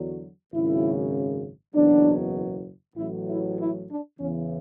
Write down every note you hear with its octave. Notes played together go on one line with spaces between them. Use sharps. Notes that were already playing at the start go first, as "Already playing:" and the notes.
Already playing: E2 D3 F#3
G#1 F#2 C#3 E4
F#1 E2 B2 F#3 D4
A1 A2 F#3 E4
E4
E4
D4
E2 C#3 E3 C#4